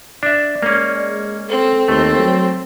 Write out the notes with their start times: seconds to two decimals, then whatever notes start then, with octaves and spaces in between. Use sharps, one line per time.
0.23 D4 D5 E5
0.63 G#3 A#3 C#4
1.48 C4 A4
1.88 D#2 A3 C4
2.19 F#3